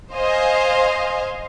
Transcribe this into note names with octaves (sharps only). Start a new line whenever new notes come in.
C5 D#5 F5 G#5